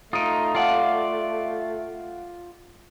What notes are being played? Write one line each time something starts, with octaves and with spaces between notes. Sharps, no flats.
A3 D#4 F4 D#6 D7
F4 D5 F5 F#5 A5